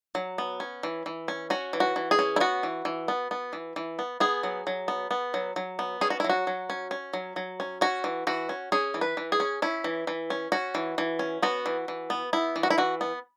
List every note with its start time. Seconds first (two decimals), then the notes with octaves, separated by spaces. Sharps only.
0.15 F#3
0.38 B3
0.60 C#4
0.83 E3
1.06 E3
1.28 C#4
1.50 C#4 F#4
1.73 E3
1.80 F#4
1.96 E3
2.11 G#4
2.19 C#4
2.36 E4
2.40 B3 F#4
2.63 E3
2.85 E3
3.08 B3
3.31 B3
3.53 E3
3.76 E3
3.99 B3
4.20 B3 G#4
4.43 F#3
4.67 F#3
4.88 B3
5.11 B3
5.34 F#3
5.56 F#3
5.79 B3
6.01 C#4 G#4
6.10 F#4
6.20 E4
6.24 F#3
6.30 F#4
6.47 F#3
6.70 C#4
6.91 C#4
7.13 F#3
7.36 F#3
7.60 C#4
7.81 C#4 F#4
8.04 E3
8.27 E3 F#4
8.49 C#4
8.72 C#4 G#4
8.94 E3
9.01 B4
9.17 E3
9.32 G#4
9.40 C#4
9.62 C#4 E4
9.84 E3
10.07 E3
10.30 C#4
10.52 C#4 F#4
10.75 E3
10.98 E3
11.19 C#4
11.42 B3 F#4
11.66 E3
11.88 E3
12.10 B3
12.33 B3 E4
12.56 E3
12.63 F#4
12.70 E4
12.78 E3 F#4
13.01 B3